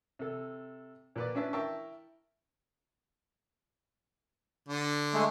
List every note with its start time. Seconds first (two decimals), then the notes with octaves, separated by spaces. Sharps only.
0.19 C3 A4
1.16 A#2 B4 D5
1.35 C#4 D4 E4 B4 E5 A5
1.53 E4 A#4 E5 G5 A5 C#6
4.68 D3
5.14 G#3 A3